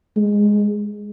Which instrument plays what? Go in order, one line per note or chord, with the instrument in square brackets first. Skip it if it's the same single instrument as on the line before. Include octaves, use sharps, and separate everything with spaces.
[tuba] G#3